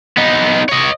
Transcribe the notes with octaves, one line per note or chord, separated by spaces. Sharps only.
B3 D#4
C#5 D#5